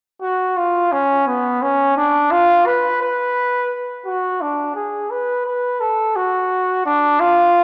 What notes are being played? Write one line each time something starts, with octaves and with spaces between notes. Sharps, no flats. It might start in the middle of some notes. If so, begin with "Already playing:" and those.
F#4
F4
C#4
B3
C#4
D4
F4
B4
B4
F#4
D4
G#4
B4
B4
A4
F#4
D4
F4